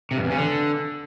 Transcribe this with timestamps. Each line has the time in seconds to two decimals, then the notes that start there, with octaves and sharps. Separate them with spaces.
0.11 C3
0.17 G2
0.24 E2
0.31 C#3
0.37 D3